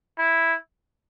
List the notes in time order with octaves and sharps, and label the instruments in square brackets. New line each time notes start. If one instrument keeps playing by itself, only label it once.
[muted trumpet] E4